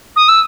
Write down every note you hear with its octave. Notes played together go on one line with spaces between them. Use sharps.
D#6
E6